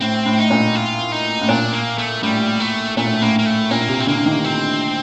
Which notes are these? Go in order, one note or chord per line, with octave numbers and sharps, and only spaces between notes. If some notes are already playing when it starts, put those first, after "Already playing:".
A2 C4
A2
D#4
A#2
F4
D#4
A2
A#2 D4
A#3
A3
A2 G3
A3
A#2 A3
A2
A2 A#3
A#3
A3
A#2 A#3
C3
C4
D3 A#3
D#3
C4